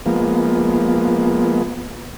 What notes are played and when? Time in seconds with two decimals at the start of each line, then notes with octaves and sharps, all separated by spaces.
0.06 F3 G#3 A#3 B3